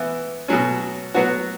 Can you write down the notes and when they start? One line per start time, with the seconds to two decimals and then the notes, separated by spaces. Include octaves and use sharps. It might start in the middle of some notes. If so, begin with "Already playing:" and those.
Already playing: E3 B3 E4
0.48 B2 F#3 C#4
1.14 F#3 B3 F#4